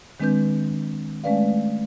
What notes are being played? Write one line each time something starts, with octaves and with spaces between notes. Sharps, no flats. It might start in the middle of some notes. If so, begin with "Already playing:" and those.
D#3 G#3 C4 D4 B4 G6
G#3 A3 C#4 B4 D5 F5